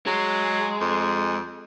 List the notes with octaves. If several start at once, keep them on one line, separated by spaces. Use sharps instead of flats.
F#3 G#3
F2